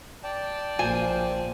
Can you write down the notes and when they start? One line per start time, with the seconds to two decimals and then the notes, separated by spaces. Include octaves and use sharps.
0.24 D5 G5 A5
0.79 A#1 A#2 A#3 C5 G#5